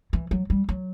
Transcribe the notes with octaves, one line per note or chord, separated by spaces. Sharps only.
E3
F#3
G3
F#3